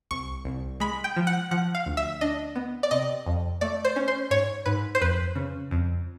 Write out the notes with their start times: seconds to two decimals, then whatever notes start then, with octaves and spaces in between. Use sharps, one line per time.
0.11 C2 C#6
0.45 C2
0.80 G#3 B5
1.04 G5
1.16 F3
1.27 F#5
1.51 F3 F#5
1.75 F5
1.86 D2
1.97 E5
2.21 D4 D#5
2.56 B3
2.83 D5
2.91 C3 D#5
3.26 F2
3.61 A3 D5
3.85 C5
3.96 C#4
4.08 C5
4.31 G#2 C#5
4.66 G#2 B4
4.95 C5
5.01 F2 B4
5.35 C#3
5.71 F2